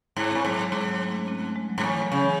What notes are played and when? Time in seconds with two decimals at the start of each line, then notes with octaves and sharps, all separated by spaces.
0.16 G#2 E4
0.31 C4
0.35 A2
0.45 G#2 F#3
0.58 F#3
0.72 G#2 G#3
0.83 F#3
0.86 G#3
1.00 A3
1.14 C#4
1.28 C4
1.42 A3
1.56 G#3
1.70 F#3
1.78 G#2
1.83 A2 E3
2.02 F#3
2.12 C#3
2.21 E3